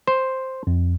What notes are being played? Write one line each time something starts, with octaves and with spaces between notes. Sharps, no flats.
C5
F2